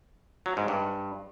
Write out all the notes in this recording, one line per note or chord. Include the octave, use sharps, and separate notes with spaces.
F#3
G#2
G2